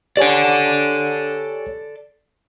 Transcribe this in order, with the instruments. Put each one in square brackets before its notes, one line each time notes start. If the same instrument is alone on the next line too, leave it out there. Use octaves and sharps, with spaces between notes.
[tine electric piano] G4 C#5 G#5 [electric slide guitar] A4 D5